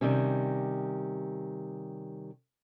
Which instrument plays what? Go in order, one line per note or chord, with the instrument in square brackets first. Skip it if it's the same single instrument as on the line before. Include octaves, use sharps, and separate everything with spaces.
[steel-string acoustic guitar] C3 D#3 G3 C#4